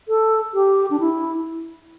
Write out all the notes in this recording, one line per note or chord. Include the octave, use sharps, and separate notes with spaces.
A4
G4
D4
E4